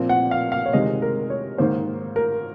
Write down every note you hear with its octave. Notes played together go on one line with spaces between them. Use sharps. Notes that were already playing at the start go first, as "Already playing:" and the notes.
Already playing: A#2 F3 C4
F#5
F5
F5
C#5
C3 D#3 G#3 C4 D#5
A#4
C#5
G#2 D#3 A#3 C5
A#4